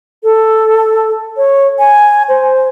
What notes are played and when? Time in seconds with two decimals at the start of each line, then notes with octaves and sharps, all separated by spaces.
0.23 A4
1.37 C#5
1.79 G#5
2.29 C5